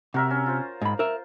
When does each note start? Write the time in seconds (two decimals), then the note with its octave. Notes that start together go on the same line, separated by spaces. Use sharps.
0.14 C3 F#4 A#4 E5
0.31 C#4
0.46 F4 C5
0.81 G#2 B5
0.99 A#4 E5